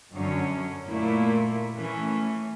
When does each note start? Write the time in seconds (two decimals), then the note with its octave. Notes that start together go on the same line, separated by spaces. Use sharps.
0.14 F#2 D3 F#3 C#4
0.86 A#2 F#3 A3 A#3 E4
1.76 E3 A3 C#4